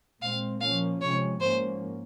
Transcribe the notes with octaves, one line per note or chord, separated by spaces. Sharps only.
A#2 G#3 C4 F5
A#2 F3 A#3 C#4 F5
C3 F3 G#3 C#4 C#5
G#2 F3 A#3 C#4 C5